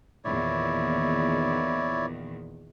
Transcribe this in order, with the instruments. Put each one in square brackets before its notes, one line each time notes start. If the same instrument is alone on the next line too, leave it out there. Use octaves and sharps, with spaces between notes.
[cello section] E2 A#2 D#3 [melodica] E4 C#5 D5